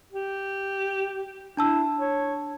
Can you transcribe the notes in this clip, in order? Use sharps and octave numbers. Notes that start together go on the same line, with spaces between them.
G4
D4 E4 A5 E6
C#5